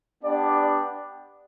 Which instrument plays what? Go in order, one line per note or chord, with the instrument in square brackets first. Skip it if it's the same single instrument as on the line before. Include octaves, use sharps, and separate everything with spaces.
[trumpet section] B3 D4 G4 D5